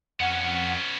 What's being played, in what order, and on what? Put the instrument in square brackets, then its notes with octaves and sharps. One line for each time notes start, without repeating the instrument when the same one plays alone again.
[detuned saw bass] F2 [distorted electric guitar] B3 C#4 [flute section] F#5